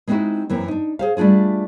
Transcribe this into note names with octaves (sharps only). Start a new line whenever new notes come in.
G#3 B3 C4 D#4 E4 F#4
F#2 E3 A#3 C4
D4 D#4
G#4 C5 F5
G3 A3 D4 F4 G#4